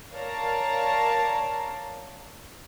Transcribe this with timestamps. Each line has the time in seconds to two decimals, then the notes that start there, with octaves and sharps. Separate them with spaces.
0.14 A#4 C#5 D5 F5 A5 A#5